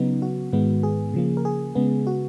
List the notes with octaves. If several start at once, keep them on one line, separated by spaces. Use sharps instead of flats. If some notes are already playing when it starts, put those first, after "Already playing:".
Already playing: C#3 F#3 B3 D#4
F#4
G#2 D#3 G#3 B3
G#4
C#3 F3 A#3
A#4
G#4
C#3 G#3 B3
F#4